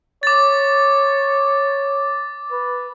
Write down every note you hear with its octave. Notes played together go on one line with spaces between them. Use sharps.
C#5 D6 A6
B4